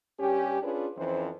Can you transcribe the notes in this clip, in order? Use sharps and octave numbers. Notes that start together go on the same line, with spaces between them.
G2 C#4 G4
C#4 D4 F4 G#4 B4
F2 E3 F3 C#4 C5